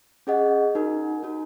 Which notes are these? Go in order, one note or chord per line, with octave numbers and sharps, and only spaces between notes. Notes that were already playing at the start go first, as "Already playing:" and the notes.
C#4 G#4 D#5 F#5
D#4 F#4 A#4
D#4 F#4 A#4